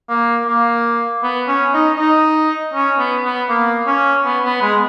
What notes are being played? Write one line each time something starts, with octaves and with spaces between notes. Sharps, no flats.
A#3
A#3
B3
C#4
D#4
D#4
C#4
B3
B3
A#3
C#4
B3
B3
G#3